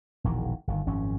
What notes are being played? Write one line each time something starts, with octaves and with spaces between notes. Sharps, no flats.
E1 A#1 D#3 E3
G1 D#3
G#1 F#2 F3 C#4